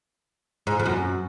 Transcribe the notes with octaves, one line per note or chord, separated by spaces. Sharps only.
G#2
F2
F#2